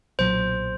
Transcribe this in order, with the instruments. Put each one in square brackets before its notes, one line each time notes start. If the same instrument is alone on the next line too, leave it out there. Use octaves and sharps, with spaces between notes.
[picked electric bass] B1 A#2 F#3 [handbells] C5